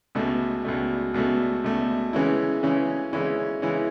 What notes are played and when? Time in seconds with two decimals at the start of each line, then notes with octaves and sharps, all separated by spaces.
0.15 C#2 B2 A3
0.65 C#2 B2 A3
1.14 C#2 B2 A3
1.64 C#2 B2 A3
2.13 C#3 E3 G#3 C#4 E4
2.63 C#3 E3 G#3 C#4 E4
3.13 C#3 E3 G#3 C#4 E4
3.62 C#3 E3 G#3 C#4 E4